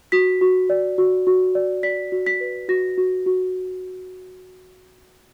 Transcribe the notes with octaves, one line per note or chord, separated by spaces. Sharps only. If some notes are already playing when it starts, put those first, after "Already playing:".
F#4 B6
F#4
D5
F#4
F#4
D5
D5 B6
F#4
B6
B4
F#4 A#6
F#4
F#4